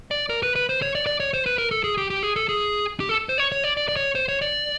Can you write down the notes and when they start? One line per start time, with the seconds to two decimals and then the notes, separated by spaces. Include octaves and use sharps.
0.11 D5
0.30 A#4
0.43 B4
0.56 B4
0.69 C5
0.82 C#5
0.95 D5
1.07 D5
1.20 C#5
1.34 C5
1.46 B4
1.58 A#4
1.71 A4
1.84 G#4
1.98 G4
2.10 G4
2.23 G#4
2.36 A4
2.49 G#4
3.00 G4
3.09 A4
3.29 C5
3.38 C#5
3.52 C#5
3.64 D5
3.77 D5
3.88 D5
3.96 C#5
4.15 C5
4.28 C#5
4.42 D5